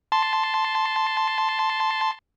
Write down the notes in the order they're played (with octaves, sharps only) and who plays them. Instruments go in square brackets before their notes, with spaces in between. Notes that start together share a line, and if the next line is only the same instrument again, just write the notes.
[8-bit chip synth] A5 C6